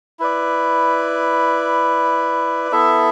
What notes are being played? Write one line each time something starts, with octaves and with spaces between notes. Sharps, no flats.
E4 B4 D5
B3 E4 A4 E5